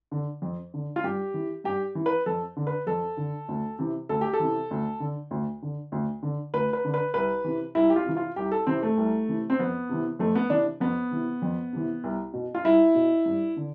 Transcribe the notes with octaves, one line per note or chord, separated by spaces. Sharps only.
D3
F2
D3
F4
G2 G4
E3
G2 G4
E3
B4
F2 A4
D3
B4
F2 A4
D3
D2
C3 E3
D2 A4
G4
A4
C3 E3
D2
D3
D2
D3
D2
D3
D2 B4
B4
D3
B4
C2 B4
C3 E3
C2 E4
G4
F4
C3 E3
F4
C2 G4
A4
C3 E3 C4
A3
C2
C3 E3
C4
F2 B3
C3 E3
F2 A3
B3
C3 E3 D4
F2 B3
C3 E3
F2
C3 E3
C2
B2
F4
C2 E4
B2
G2
D3